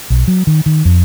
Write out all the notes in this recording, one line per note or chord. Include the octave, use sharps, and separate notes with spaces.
B1
F#3
D#3
D#3
F2